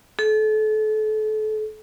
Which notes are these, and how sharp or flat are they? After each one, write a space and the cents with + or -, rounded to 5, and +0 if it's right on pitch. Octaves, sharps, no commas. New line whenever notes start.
A4 -35